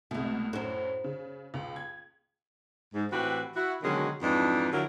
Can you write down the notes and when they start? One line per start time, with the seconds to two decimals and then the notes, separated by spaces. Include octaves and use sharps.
0.11 C2 B2 G#3 A3
0.53 F#2 A2 F#4 C5
1.04 C#3
1.54 C#2
1.76 G#6
2.94 G#2
3.11 A2 E3 C4 F#4 G4 B4
3.55 E4 F#4
3.83 B2 D3 D#3 F#3 G#3 C#4
4.22 F2 G#2 E3 D4 D#4
4.72 D3 F3 F#3 E4 A#4